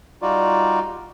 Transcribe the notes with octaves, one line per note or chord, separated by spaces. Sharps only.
G3 D#4 F4 F#4 D5